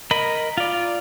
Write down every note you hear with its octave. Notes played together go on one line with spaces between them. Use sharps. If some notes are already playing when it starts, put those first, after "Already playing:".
A#4 D#5 B5
F4 D5